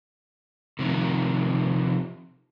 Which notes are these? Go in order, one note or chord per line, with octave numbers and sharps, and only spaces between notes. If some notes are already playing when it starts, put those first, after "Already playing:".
C3 D#3 F3